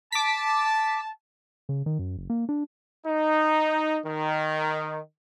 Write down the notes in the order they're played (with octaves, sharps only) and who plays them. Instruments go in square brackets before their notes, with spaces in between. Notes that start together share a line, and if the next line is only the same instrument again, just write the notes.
[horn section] A5 [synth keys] D6 B6
[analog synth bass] C#3
D#3
F#2
F#1
A#3
D4
[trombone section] D#4
D#3